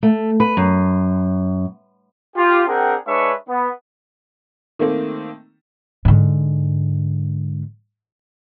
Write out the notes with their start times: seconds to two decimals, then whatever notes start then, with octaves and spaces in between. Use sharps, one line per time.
0.03 A3
0.40 B4
0.57 F#2
2.36 F4 G4
2.67 C4 D4 G#4 A#4 F#5 G5
3.06 G#3 D4 B4 C#5 E5 C#6
3.49 B3
4.79 D#3 A3 A#3 C4
6.05 G#2 D3